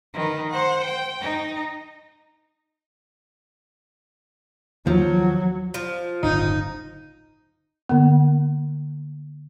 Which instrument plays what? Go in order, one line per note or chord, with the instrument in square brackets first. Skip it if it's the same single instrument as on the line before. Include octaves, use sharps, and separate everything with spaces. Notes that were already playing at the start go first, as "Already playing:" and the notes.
[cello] D#3 B4
C5 F#5
G5
D#4
[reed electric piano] D#2 [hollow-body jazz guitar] F3 [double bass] F#3
[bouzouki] F3
[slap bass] D1 G1 C#3 [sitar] D#4
[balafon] D3 A#3 B3